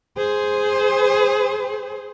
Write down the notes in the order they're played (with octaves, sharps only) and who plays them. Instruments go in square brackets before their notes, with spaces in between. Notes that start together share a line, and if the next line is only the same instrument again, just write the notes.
[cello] G#4 C5